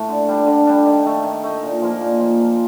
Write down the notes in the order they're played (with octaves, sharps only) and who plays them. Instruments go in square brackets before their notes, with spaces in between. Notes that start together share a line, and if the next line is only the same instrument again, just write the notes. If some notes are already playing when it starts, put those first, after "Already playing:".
Already playing: [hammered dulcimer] A2 A3
D3
G3 D4
D3
G3 D4
D#3
A3 D#4
D#3
A3 D#4
A#2
F3 A#3
A#2
F3 A#3
F3